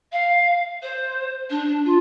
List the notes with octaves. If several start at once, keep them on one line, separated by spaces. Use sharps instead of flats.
F5
C5
D4
F4